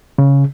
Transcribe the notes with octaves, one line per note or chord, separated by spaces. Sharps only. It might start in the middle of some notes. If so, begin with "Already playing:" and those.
C#3